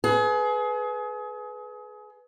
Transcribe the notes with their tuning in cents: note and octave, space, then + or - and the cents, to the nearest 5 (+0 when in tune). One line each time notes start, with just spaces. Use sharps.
G#4 +30 B4 +0